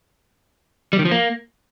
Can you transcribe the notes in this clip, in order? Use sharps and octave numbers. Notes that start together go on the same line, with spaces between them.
G3
D#3
F3
A#3